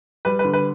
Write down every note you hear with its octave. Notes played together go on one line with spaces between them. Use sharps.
G3 B4
B4
D3
B4